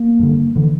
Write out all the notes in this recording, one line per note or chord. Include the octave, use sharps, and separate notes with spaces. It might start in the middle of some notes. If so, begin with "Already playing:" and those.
Already playing: A#3
G2 D3
D3 E3